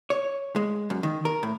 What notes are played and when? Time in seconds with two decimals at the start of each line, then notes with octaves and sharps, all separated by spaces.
0.10 C#5
0.56 G#3
0.90 F#2
1.03 D#3
1.25 A#4
1.43 A2